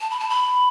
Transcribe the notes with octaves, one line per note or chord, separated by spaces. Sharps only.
A5
B5
A5
B5